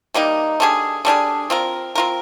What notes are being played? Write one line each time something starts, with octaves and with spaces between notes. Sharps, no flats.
D#3 G3 A#3 D#4
D3 G3 D4 G#4
D3 G3 D4 G#4
C4 F4 A#4
C4 F4 A#4